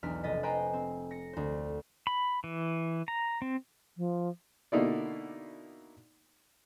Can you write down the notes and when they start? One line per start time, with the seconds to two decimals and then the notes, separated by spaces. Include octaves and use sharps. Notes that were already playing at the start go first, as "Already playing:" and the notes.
0.03 B1 E2 D4 F6 B6
0.23 F1 D#5 A6 B6
0.43 B4 C5 D#5 G5 G#5 A#5
0.73 C4
1.11 A#6 C#7
1.33 D2 C5
2.07 B5
2.44 E3
3.08 A#5
3.42 C4
3.97 F3
4.72 B2 D3 A#3 D#4 E4 D5